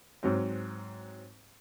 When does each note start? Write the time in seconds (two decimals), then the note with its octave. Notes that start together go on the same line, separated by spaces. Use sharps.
0.23 G#2 F#3 C4